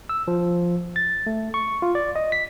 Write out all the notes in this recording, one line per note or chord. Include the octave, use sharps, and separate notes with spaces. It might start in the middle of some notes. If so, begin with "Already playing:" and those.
E6
F3
A6
A3
C#6
F4
D5
D#5
B6